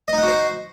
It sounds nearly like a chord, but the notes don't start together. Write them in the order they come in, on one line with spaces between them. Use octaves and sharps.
D#5 D#4 F#5 F#4 C5